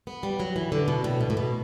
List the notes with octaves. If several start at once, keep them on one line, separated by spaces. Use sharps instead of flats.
B3
G3
F#3
E3
D3
B2
A2
B2
A2
B2